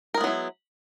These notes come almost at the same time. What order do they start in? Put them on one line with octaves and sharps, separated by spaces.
A#4 G#3 B3 F#3 E4